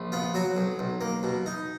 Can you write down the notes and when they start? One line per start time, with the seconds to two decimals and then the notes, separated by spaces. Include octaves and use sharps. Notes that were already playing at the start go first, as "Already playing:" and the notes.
Already playing: A#1
0.12 B3 F4
0.34 F#3 F#4
0.57 B1
0.79 B1
1.01 A#3
1.23 B2
1.46 D#4